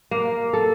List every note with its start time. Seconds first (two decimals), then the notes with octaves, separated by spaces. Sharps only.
0.11 A#3
0.53 A4